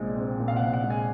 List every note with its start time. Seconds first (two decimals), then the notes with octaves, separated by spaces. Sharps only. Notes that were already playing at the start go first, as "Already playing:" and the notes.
Already playing: A#1 A#2 G#3 C4
0.16 C4
0.40 A#2
0.48 F5
0.56 F#5
0.61 A#1
0.73 F#5
0.84 G#3
0.90 G#5